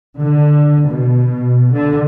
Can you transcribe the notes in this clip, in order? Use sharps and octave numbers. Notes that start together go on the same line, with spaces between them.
D3
B2
D3